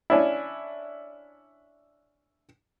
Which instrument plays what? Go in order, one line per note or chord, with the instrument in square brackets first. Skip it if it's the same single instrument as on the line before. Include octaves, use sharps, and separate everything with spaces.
[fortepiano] C#4 D4 E4